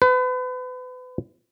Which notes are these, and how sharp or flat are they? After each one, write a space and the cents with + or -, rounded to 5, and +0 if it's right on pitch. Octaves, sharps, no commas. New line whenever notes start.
B4 +35